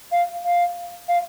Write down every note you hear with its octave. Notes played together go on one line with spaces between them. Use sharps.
F5
F5
F5